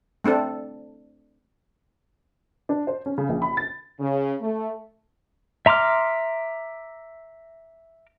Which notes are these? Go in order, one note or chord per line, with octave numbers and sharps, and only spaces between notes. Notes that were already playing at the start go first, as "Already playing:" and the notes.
A3 C4 D4 A4
D4
C5
C#4
C#3
A#1
B5
A6
C#3
A3
E5 A#5 C6 D6 F6